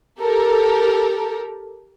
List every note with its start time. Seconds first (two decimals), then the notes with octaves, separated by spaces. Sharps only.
0.19 G4 A4 A#4